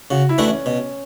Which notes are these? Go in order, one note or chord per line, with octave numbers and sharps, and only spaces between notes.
C#3 F#4
E4
E3 A3 D4 F#4
C#4
B2